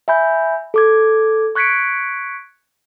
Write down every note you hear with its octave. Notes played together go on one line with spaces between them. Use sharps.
E5 G#5 B5 G6
A4 D6 G#6
C#6 F#6 G#6 B6 C#7 D7